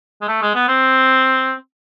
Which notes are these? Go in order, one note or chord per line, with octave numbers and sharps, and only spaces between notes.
G#3
A3
G#3
B3
C4